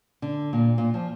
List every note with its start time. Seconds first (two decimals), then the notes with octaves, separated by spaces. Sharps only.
0.22 D3
0.53 A#2
0.78 A#2
0.94 F3